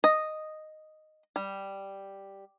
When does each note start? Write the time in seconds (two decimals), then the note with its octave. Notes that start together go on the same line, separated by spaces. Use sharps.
0.04 D#5
1.36 G3